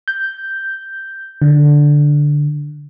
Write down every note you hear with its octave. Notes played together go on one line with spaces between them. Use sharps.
G6
D3